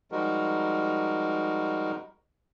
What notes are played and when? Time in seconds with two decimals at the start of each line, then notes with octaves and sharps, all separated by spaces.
0.12 F3 G3 G#3 D#4 F#4 A#4